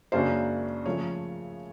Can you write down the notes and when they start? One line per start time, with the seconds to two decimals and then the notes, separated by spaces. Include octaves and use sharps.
0.12 F#2 C#3 F#3 A#3 D4 C5
0.86 C#3 F3 A3 C#5